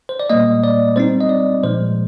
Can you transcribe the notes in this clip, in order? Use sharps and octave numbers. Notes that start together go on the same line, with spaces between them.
C5
D5
A#2 G3 A#3 D#5
D5
G3 C4 D#4 C5
D#5
D5
A#2 F3 G#3 C5